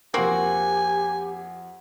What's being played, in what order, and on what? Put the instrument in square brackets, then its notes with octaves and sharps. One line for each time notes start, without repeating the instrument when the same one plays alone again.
[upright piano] F2 F#5 [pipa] A#3 C4 F#4 [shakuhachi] G4 [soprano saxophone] G#5